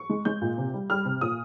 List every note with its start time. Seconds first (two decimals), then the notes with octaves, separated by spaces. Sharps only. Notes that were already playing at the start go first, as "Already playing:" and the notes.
Already playing: C#6
0.09 G#3
0.25 G#3 G6
0.42 A#2
0.58 C3
0.73 G3
0.90 G3 F6
1.05 C3
1.21 A#2 D#6